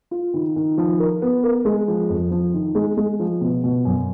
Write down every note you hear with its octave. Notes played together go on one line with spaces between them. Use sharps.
F4
D#3
D#3
F3
A#4
B3
A#4
G#3
F3
F2
F3
D#3
G#3
G#3
F3
B2
B2
F#2